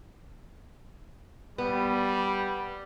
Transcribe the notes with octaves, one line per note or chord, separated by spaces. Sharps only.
G3 B3